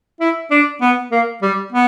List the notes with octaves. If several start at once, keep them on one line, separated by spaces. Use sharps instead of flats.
E4
D4
B3
A#3
G3
B3